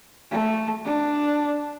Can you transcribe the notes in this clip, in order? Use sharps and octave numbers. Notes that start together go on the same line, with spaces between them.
A3
D4